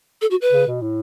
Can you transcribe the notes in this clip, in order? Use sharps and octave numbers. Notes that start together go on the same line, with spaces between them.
A4
F#4
B4
C#3
B2
A2